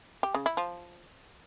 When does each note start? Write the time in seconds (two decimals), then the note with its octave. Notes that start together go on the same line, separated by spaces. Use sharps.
0.23 G4
0.34 C#3
0.46 E4
0.57 F3